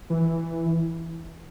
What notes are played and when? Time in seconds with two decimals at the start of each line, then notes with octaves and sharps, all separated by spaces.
0.10 E3